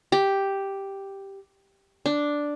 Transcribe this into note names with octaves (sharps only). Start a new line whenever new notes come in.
G4
D4